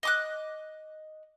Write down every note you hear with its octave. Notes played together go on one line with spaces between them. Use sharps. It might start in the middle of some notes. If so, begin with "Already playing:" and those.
D#5 D6 F#6